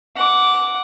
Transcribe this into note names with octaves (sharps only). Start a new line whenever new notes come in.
F#5 D6